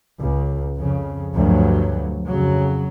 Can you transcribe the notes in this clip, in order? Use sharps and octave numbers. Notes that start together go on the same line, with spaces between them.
C#2
F2 C#3
D2 G2 F3 F#3
F2 C#3 F#3